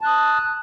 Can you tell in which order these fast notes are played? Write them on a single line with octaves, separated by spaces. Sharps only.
A5 F#6 D#6